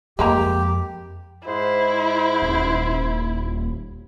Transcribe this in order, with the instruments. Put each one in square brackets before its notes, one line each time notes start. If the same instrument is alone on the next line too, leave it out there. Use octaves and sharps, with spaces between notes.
[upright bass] F2 [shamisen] G#3 A#3 A#5 [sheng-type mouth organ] G4
[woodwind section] G#2 C5 [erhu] E4
[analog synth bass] D#1